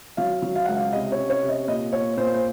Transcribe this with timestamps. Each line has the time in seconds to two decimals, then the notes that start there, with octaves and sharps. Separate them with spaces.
0.17 F#3 F5
0.42 F#3
0.55 F5
0.65 C#2 F#5
0.76 F5
0.93 C3 D#5
1.12 C#5
1.18 C#4
1.30 C#5
1.43 C3
1.49 D#5
1.67 A#2 D#5
1.92 A#2 C#5
2.17 A#2 C5
2.34 C5